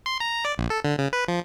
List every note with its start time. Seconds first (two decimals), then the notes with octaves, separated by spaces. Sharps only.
0.06 C6
0.20 A#5
0.45 D5
0.58 A#1
0.70 A4
0.85 D3
0.99 C#3
1.13 B4
1.28 F3